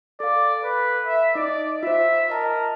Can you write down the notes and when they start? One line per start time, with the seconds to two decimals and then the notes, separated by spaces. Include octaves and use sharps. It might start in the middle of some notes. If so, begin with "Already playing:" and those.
0.20 A4 D5 F5
0.64 B4
1.06 E5
1.35 D#4 D5 D#5 D7
1.83 F4 C5 E5
2.30 A#4 D#5 A5 A#5